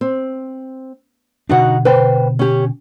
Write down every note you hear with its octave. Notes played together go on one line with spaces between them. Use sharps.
C4
B2 D3 D4 D#4 F#4 F#5
B4 C5 G5
C#4 G4